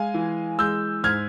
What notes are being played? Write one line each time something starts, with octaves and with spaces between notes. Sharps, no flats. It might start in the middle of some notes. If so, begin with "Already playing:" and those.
Already playing: G#3 F5 G#5
E3
G#3 E6 G6
G#2 F6 G#6